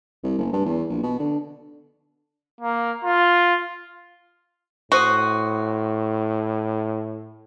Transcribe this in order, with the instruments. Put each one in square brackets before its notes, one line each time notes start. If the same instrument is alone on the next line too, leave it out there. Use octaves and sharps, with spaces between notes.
[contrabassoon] C2
F#1
G2
E2
A#1
B2
D3
[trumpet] A#3
F4
[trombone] A2 [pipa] F#4 [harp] C5 D#6